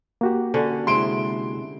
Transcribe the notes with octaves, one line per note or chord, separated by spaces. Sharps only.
A#3 F#4 G4
D3 C#4
C3 G#3 E4 C6 D7